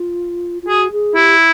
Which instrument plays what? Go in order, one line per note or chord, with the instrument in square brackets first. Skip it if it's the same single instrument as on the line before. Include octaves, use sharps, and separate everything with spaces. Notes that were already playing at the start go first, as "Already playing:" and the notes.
Already playing: [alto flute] F4
F4
[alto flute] F#4 [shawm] G#4
[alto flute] G#4
[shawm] E4 [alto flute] G4